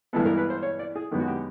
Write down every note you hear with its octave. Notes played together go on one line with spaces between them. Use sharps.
G2 E3 G#3 B3 A4
A#4
B4
C5
C#5
D5
G#4
F#2 D#3 G#3 B3 G4
F#4
G4